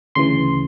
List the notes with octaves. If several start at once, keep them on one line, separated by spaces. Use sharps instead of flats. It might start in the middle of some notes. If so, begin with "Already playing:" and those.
D2 C#3 E3 C6